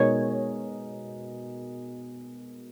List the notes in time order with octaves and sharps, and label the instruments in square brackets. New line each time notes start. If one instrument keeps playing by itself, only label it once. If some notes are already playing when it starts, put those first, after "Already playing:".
Already playing: [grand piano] B2 G#3 D#4 A#4 D#5 [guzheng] C#5